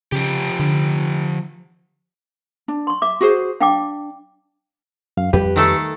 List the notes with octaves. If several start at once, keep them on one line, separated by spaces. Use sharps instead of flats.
C#3 F3 G4
D3
D4
C6 C#6
E5 D6
F#4 G#4 C5
D4 F5 G5 D6
F#2 F5
F2 G3 G4 B4
D#3 A3 A4